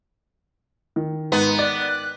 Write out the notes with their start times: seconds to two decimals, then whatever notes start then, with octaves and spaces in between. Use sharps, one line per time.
0.96 D#3
1.32 G#2 B3 B4
1.59 D5 F#6
1.88 F#6